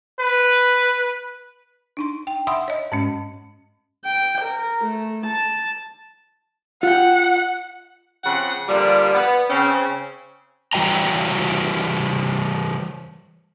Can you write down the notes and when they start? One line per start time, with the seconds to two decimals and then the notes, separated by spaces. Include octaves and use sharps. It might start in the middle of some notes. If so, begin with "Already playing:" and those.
0.20 B4
1.97 D4 D#4 C6
2.27 G5
2.47 E5 F#5 B5 C6 D#6 E6
2.68 C#5 D#5
2.92 G#2 G#3 C#4
4.05 G5
4.41 A#4
4.84 A3
5.26 A5
6.83 F4 F#5 G5
8.24 C#3 F3 C4 F#5
8.68 A#2 D3 F3 G3
9.14 B3
9.49 C#3 C4 C#4
10.73 E3 G3 F#4 G5 A#5